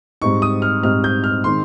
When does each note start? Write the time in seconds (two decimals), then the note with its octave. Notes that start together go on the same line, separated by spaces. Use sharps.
0.21 G#2 G3 C4 D#4 C#6
0.42 D#6
0.62 F6
0.83 G#2 G3 C4 D#4 F6
1.04 G6
1.24 F6
1.44 D#3 G#3 C4 D#4 C6